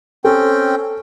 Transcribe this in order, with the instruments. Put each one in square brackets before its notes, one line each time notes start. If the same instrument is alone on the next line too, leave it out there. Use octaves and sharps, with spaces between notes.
[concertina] C4 C#4 G5 [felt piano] A4